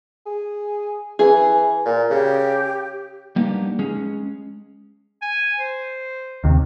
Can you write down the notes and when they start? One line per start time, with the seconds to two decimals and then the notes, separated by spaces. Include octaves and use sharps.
0.26 G#4
1.19 E3 G#4
1.86 A#2
2.10 C#3 G4
3.36 G3 A#3 B3 D4 D#4 G4
3.79 G#3 C#4 G#4
5.22 G#5
5.60 C5
6.44 D#2 C3